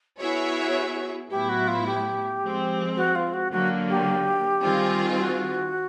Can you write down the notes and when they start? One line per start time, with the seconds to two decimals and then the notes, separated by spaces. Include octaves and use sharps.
0.19 B3 E4 F#4 G#4 C#5 E5
1.30 A2 F#3 B3 E4 G4
1.49 F#4
1.68 F4
1.86 G4
2.41 F3 G#3 C4
2.96 F#4
3.15 F4
3.33 F#4
3.52 D3 F#3 A#3 F#4
3.89 G4
4.63 D#3 G3 C4 F4 G#4
5.18 F#4